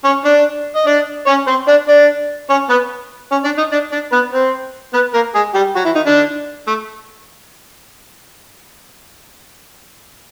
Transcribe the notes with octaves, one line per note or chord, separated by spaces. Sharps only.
C#4 C#5
D4 D5
D#5
D4 D5
C#4 C#5
C4 C5
D4 D5
D4 D5
C#4 C#5
B3 B4
C#4 C#5
D4 D5
D#4 D#5
D4 D5
D4 D5
B3 B4
C4 C5
B3 B4
A#3 A#4
G#3 G#4
G3 G4
F#3 F#4
E3 E4
D#3 D#4
D3 D4
A3